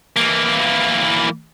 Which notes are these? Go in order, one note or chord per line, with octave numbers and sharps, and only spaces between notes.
E3 A#3